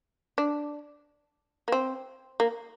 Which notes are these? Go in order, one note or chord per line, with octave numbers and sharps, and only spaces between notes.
D4
A#3
C4
A#3